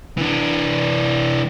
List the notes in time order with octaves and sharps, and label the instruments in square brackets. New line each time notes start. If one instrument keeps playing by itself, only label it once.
[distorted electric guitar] E3 D4